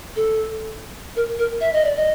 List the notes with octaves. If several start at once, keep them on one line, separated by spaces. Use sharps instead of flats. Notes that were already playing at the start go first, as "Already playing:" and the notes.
A4
A#4
A#4
E5
D#5
D5
D#5